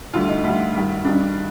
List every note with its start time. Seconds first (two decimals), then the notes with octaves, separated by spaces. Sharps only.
0.13 D2 D3 G3 F4
0.28 D#4
0.44 D2 D3 G3
0.74 G2 D#3 G3
1.05 G2 D#3 G3 D4